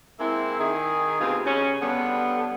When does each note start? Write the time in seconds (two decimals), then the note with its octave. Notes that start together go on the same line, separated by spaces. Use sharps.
0.19 G#3 A#3 C4 E4
0.59 D#3 G#4
1.21 D2 B2 C4 F4 G4 G#4
1.46 C#3 C#4
1.81 G2 D3 G3 B3